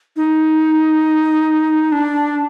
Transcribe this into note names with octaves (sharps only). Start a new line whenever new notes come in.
D#4
D4